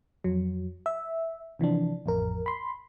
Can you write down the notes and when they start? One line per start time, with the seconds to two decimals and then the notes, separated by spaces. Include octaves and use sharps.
0.24 F2 F#3
0.86 E5
1.59 C3 E3 F3 D4
2.06 A1 F2 A#4
2.46 B5 C6